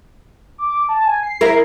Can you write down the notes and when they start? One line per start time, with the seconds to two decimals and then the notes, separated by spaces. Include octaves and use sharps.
0.58 D6
0.89 A5
1.07 G#5
1.23 C7
1.41 E4 A#4